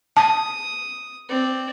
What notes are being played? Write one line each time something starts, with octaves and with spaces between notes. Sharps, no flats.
A5 D#6
C4 D5